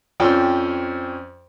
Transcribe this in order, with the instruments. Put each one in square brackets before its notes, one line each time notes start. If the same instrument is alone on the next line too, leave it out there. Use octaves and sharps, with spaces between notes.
[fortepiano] F2 F3 C#4 D5 G5 E6